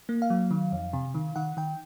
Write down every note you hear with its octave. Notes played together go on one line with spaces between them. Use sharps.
A#3
F5
F#3
D#3
F2
C3
D#3
D#3 F#5
D#3 G5